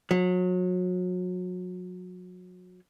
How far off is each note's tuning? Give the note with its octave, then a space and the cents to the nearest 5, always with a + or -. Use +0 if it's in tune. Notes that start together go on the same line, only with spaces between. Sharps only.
F#3 -30